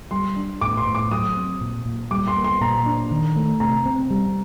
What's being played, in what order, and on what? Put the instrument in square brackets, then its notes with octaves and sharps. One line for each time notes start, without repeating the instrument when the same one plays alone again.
[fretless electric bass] G3 [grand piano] C6
[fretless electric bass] D4
[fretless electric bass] A2 [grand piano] D6
[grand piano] C6
[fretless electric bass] A2
[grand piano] D6
[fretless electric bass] F#3 [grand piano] D#6
[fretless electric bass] C4
A#2
A#2
[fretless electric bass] G3 [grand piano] D6
[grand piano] C6
[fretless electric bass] A#3
[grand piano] C6
[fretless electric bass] A#2 [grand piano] A#5
[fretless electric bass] D4
D#3
A3
[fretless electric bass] C3 [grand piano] A#5
[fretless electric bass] C4
G3